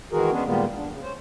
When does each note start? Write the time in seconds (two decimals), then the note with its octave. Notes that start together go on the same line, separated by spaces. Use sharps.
0.12 D#3 E3 G#3 F#4 G#4 A#4
0.31 G#3 B3 C#4 D4 G#4
0.45 A#2 D#3 G3 G#3 A#3 B3
0.76 E2 D4
0.90 C#3
1.02 C#4 C5